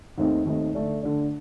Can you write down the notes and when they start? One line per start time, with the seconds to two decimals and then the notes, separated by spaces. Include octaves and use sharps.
0.18 D#2 D#3 A3 C4 D#4
0.45 D#2 D#3 A3 C4 D#4
0.75 D3 A3 D4
1.03 D3 A3 D4